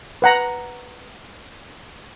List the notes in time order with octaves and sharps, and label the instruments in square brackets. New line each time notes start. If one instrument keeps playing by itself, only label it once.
[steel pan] B4 F#5 A#5